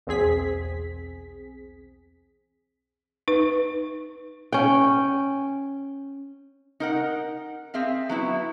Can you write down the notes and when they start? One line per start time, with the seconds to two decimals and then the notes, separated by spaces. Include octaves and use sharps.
0.07 B1 E2 C4 G#4 B6
3.28 D#4 B4
4.52 C#4 G5
6.80 D#4 A#4 F#5
7.74 C4 G#4 E5 F5
8.09 F#3 B3 E4